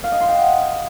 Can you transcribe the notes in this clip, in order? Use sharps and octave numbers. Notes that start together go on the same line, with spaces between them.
F5
D#5
C6
G5
F#5